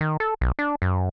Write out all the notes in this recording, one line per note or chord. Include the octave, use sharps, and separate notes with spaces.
D#3
A4
B1
D4
F#2